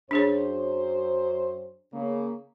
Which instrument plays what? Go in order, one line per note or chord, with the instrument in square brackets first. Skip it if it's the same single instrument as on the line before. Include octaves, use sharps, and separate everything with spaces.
[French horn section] F#2 C5 [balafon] D4 G#4 C#5
[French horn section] C#3 A#3